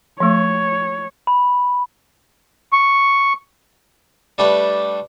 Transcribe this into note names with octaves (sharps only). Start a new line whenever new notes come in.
F3 A3 C#5
B5
C#6
G3 A3 D4 G4 B4 E5